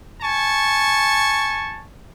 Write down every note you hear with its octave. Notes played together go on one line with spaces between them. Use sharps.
G#5 A5 C#6